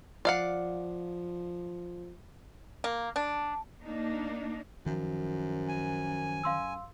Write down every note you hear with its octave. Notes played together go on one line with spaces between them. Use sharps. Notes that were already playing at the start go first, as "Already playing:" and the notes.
F3 D5 F5 F#5
A#3
D4
A#3 D4 D#4
F#2 D#3 F3
G#5
F#2 F5 C6 E6